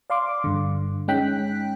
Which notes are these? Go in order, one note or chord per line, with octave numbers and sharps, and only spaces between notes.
D5 F5 C6 D6
G2 D3
G#3 C#4 D#4 G5 F#6 B6